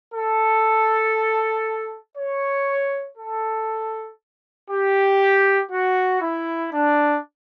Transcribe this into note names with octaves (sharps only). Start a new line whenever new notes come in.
A4
C#5
A4
G4
F#4
E4
D4